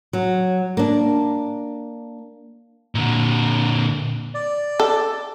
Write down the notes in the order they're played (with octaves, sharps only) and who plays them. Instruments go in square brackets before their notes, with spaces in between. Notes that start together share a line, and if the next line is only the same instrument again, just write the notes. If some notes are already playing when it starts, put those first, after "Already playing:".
[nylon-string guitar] F#3
A#3 D4
[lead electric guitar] A#2 D3
[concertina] D5
[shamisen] A4